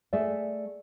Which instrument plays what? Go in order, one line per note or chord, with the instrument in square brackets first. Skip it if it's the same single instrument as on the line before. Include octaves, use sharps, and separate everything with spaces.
[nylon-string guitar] A3 G#4 D5 E5